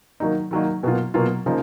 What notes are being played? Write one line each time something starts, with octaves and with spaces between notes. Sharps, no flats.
D#3 F#3 A#3 D#4
D#3 F#3 A#3 D#4
B2 F#3 A#3 F4
B2 F#3 A#3 F4
C#3 F3 A#3 D#4